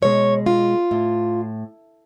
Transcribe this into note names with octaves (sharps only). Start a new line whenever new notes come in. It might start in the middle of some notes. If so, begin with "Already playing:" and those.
B2 G#3 C#5
F4
A2